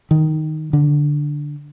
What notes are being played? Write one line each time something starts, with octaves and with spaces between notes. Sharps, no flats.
D#3
D3